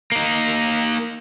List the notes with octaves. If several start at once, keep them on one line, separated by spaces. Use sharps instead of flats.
A#3 D#4